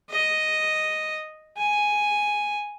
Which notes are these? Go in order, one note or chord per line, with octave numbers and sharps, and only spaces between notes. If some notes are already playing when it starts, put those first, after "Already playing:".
D#5
G#5